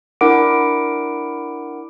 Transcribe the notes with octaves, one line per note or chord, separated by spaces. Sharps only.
D4 E4 A#4 F#5 D6 D7